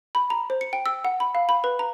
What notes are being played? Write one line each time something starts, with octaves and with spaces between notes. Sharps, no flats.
B5
A#5
C5
C#7
G5
E6
F#5
B5
F5
B5
B4
A#5